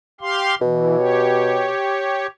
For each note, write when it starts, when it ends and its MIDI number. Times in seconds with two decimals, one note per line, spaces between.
0.21 0.55 67
0.21 0.55 77
0.21 0.55 84
0.61 1.70 47
0.61 0.96 52
0.97 2.26 67
0.97 2.26 73